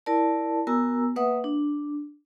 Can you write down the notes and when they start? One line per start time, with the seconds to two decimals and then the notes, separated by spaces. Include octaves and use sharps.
0.06 E4 A#4 D5 A5
0.67 B3 F#4 A#4 G#5 A#5 E6
1.16 A#3 B4 E5 F#5 D#6
1.44 D4